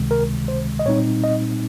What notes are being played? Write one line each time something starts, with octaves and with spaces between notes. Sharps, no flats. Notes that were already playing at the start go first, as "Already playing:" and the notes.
Already playing: C#2 C3 D#3 G#3
A#4
C5
D#5
A#2 G3 C4 D#4 C#5
D#5